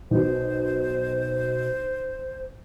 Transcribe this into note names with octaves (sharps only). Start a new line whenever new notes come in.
B1 B2 C5